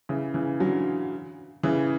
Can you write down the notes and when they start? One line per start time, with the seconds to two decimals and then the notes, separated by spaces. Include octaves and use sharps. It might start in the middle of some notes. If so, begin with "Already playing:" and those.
0.09 C#3 E3
0.34 C#3 E3
0.60 D3 F#3
1.63 C#3 E3